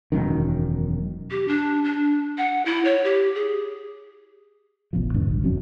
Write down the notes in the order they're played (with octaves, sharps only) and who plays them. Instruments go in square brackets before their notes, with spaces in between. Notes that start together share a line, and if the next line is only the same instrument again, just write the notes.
[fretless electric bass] E1 A#1 F#2 D#3
[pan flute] G4
D4
D4
F#5
E4
C#5
G4
G#4
[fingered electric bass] E1 A1 E2 F3
E2 G#2 D3 E3
A#1 F#2
E1 F2 F#3 C#4